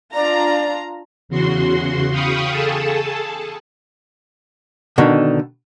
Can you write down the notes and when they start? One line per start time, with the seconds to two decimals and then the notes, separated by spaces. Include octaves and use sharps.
0.14 D4 F4 D5 A#5
1.29 E2 C#3 F#4 C6
2.11 F5 G5 B5 C#6 D#6
2.51 G#4 A4 A5
4.98 B2 D3 D#3